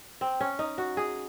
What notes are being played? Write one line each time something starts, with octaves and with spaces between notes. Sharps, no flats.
C4
C#4
D#4
F#4
G#4